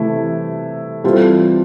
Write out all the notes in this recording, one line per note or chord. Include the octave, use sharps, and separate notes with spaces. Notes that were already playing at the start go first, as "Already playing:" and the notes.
Already playing: C3 E3 A3 E4
E3 G3 C4 F4 A4